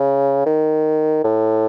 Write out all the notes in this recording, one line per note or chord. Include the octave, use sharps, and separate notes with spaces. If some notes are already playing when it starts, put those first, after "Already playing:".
Already playing: C#3
D#3
A2